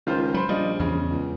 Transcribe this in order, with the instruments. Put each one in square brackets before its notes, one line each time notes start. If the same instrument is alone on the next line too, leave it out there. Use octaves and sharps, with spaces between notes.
[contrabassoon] C#2 [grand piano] D#3 F4 C5
[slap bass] F#3 [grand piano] C5 B5
[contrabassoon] A#1 [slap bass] G3 [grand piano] F4 D5 D#5
[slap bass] E2 [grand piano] C#3
[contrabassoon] C#2